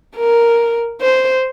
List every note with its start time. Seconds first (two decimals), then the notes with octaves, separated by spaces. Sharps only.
0.16 A#4
1.01 C5